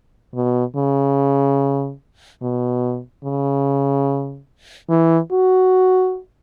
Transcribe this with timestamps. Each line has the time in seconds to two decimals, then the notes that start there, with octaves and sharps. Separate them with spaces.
0.35 B2
0.76 C#3
2.42 B2
3.24 C#3
4.90 E3
5.32 F#4